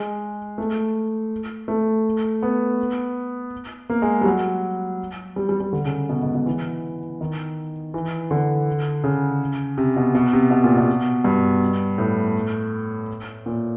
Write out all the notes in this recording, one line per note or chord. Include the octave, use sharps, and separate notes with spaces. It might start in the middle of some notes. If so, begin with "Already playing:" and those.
Already playing: G#3
A3
A3
B3
A#3
G#3
G3
F#3
G3
G3
G3
D3
C#3
B2
G#2
B2
E3
D#3
E3
D3
C#3
C3
B2
B2
C3
B2
A#2
B2
G2
A2
A#2